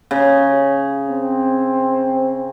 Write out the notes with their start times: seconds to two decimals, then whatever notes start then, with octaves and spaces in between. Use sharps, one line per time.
0.11 C#3
1.07 C4